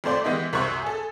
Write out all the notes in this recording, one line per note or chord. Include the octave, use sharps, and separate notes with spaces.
F2 A3 C5 D5 C6
E3 G#3 B3 E4 G4 D#5
C2 F#2 F#4 C5 C#6
G#4 A4